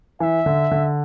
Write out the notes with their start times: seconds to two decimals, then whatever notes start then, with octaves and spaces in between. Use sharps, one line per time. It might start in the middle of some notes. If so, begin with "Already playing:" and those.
0.20 E3 E5
0.46 D3
0.71 D3